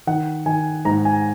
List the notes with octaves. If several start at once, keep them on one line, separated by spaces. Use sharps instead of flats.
D#3 F#5
D#3 G#5
G#2 A#5
G#5